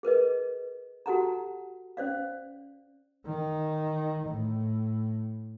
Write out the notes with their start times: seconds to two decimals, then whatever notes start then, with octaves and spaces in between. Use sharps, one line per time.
0.03 G#4 A#4 B4 D#5
1.06 F#4 G4 A4 F#5 A5 A#5
1.97 C#4 C5 D5 F5
3.26 D#3
4.28 A2